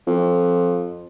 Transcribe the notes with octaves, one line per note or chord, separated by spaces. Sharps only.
F2